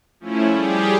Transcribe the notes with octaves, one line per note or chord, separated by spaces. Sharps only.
F3 A3 C#4 E4
G3 G4 G#4